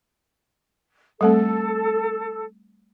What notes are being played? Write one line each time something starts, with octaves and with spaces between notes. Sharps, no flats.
G3 A3 C4 A4